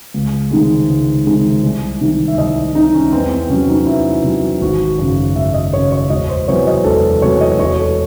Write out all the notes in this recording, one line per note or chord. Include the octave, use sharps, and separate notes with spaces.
C#2
C3 D#3 G#3
C#2
C3 D#3 G#3
C2
C3 D#3
E5
C2 D#5
C3 D#3 D#4
C#4
E2 C4
C4
C3 F#3 C#4
D#4
E2 E4
C3 F#3
G#1 F#4
F#2 C#3
G#1 E5
D#5
F#2 C#3 C#5
C#5
E1 D#5
C5
E2 C3 F#3 C#5
D#5
E1 A4
E2 C3 F#3 C#5
D#5
E1 C#5
A4